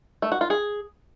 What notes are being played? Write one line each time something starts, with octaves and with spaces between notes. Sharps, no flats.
A3
F#4
F4
G#4